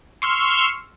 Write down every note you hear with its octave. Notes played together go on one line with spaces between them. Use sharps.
C6 C#6 E6 F6